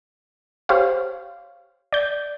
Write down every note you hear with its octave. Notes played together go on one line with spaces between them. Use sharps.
G4 C5 C#5 F5
D5 G6